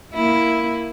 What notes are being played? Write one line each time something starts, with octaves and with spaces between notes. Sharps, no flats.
A#3 E4